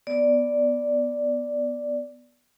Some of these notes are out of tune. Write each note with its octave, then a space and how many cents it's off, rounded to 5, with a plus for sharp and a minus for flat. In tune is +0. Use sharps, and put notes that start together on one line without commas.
B3 +0 D5 +0